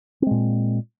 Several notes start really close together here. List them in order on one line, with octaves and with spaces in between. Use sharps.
C4 G#3 A#2